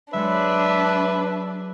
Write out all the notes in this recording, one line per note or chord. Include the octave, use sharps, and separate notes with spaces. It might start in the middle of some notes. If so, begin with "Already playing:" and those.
F#3 G#3 D4 A4 B4 E5